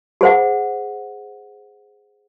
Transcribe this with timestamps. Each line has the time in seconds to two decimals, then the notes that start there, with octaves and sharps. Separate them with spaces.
0.21 G#4 C5 F#5